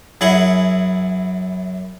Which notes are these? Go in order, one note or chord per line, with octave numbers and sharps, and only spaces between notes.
F#2 E4 G#4 F#5